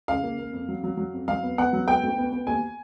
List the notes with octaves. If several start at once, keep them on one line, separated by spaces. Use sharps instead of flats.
C#3 F5
A#3
A#3
F2
F#3
F#3
F#3
F2
F#3 F5
B3
B3 F#5
F#3
B3 G5
D2
B3
B3
D#2 G#5